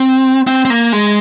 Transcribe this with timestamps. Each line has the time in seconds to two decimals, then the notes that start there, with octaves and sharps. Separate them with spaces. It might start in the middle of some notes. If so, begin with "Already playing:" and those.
Already playing: C4
0.47 C4
0.65 C4
0.70 A#3
0.92 G#3